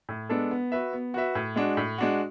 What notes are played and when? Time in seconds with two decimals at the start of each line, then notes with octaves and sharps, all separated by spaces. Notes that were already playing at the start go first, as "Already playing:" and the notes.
0.09 A2
0.29 G#3 B3 D4 A4
0.51 B3
0.72 F#4 B4 E5
0.93 B3
1.14 F#4 B4 E5
1.35 A2
1.56 G#3 D4 F#4
1.77 A2
1.98 G#3 D4 F#4